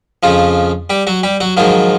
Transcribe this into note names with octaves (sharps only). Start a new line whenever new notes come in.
F2 C#3 F3 F4
G3 G4
F#3 F#4
G3 G4
F#3 F#4
G#2 D#3 F3 F#3 F4